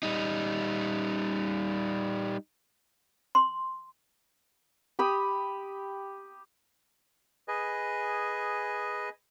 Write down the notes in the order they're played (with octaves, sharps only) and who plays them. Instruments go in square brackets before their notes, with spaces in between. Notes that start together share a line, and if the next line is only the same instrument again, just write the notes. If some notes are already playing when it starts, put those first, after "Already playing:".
[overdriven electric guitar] G3 D#4
[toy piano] C6
[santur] G4 B5 D#6
[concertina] G#4 B4 D#5 G#5